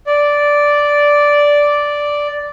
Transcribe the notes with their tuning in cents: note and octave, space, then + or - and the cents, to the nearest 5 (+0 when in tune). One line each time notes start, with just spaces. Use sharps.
D5 -5